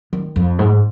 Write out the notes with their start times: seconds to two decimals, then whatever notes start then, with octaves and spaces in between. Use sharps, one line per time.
0.13 D#3
0.36 F2
0.59 G#2